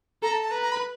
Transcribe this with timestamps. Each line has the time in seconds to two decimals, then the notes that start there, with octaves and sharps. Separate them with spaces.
0.23 A4 A#5
0.32 A5
0.42 A5
0.51 B4 A#5
0.62 A#5
0.72 B5